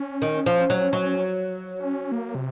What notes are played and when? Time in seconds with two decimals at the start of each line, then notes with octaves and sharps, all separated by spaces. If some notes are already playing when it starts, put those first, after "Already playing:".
Already playing: C#4
0.22 D#3
0.46 F3
0.70 F#3
0.93 F#3
1.80 C#4
2.12 A#3
2.35 C3